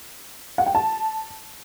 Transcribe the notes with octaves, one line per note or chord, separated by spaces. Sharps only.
F#5
G5
A5